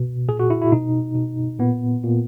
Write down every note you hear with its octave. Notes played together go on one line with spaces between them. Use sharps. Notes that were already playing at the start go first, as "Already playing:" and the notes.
Already playing: B2
A#2 G#4
F#4
E4
E4
B2 D#4
B2
A#2 B3
A#2